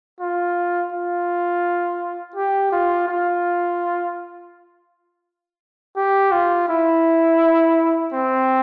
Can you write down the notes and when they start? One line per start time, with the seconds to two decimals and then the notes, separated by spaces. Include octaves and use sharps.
0.20 F4
0.92 F4
2.36 G4
2.72 F4
3.08 F4
5.96 G4
6.32 F4
6.69 E4
8.12 C4